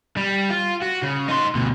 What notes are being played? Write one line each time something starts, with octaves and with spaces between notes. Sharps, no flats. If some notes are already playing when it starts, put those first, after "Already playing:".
G3
F4
F#4
C#3
D#4 C6
D2 B2